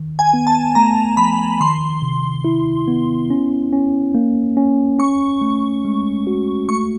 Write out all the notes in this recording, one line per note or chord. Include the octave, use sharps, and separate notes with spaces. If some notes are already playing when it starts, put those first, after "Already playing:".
Already playing: D#3
G#5
B3
A5
A3 A#5
F3 B5
D#3 C6
C3
E4
B3
C#4
C#4
A#3
C#4
C#4 C#6
A3
G#3
F#4
A3 C#6